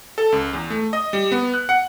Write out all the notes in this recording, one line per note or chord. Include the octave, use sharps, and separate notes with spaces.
A4
C#2
E2
A3
D#5
G3
B3
F#6
F#5